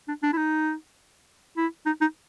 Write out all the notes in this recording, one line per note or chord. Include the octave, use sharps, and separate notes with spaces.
D4
D4
E4
D#4
E4
D#4
D#4